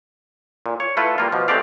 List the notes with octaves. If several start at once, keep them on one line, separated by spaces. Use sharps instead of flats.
A#2
C#5
A3 E4 F4 A4 B4
G3 A#3 F4
B2 F3
G#3 A3 C4 G4 D5 F5